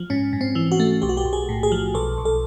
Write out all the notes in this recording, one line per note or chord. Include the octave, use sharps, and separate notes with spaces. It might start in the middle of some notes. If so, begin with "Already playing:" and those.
Already playing: F3
G#2 C#4
G#2
C4
E3
F#4
A3
B1 G4
F#4
G4
B1
G#4
A2
G#4
F3
B1 A4
B1
A4